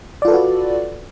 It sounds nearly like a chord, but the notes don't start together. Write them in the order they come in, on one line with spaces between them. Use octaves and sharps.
D5 F4 A4 B4 F#4